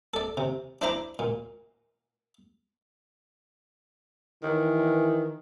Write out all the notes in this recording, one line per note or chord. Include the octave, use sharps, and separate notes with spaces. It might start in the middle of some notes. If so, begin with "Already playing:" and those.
A4 D5
C3
D4 E4 C5 A#5 B5 D6
A#2
D#3 E3